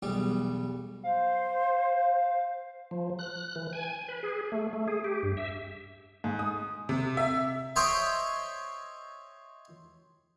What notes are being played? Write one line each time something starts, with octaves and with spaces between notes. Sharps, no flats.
B1 E2 G3 D6
C5 F5
F3
F#6
E3
G#5
B4
G#4
A3
A3
G#4
G4
G2
E5
G#2
D#6
C3
E5
C5 C#5 D#5 E5 G5 C6